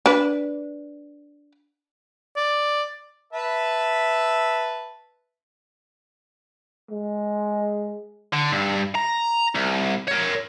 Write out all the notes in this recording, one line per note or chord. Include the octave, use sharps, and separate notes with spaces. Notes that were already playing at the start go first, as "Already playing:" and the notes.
D4 B4
D5
B4 E5 A5
G#3
D3
G2
A#5
C2
A#4 C#5